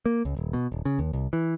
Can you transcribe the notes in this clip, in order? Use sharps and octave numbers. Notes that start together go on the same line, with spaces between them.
A#3
C#2
D#1
B2
D#1
C#3
D#2
C2
E3